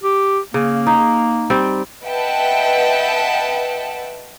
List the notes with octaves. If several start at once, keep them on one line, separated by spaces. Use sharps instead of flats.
G4
C#3 A#3
D#4
G3 C4
B4 D#5 E5 F#5 G5 A5